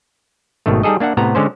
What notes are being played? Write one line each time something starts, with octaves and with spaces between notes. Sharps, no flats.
G#1 B2 D#3 A3
G3 D#4 G#4 A4 D#5
A#3 D4 E5 F#5
A2 C3 B3 A#5
D3 G#3 C#4 C5